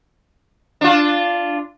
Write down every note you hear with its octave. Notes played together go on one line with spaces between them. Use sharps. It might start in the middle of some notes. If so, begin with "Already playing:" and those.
D4 F4